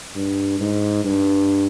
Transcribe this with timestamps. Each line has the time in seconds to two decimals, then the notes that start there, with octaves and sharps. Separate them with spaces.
0.16 G2
0.60 G#2
1.05 G2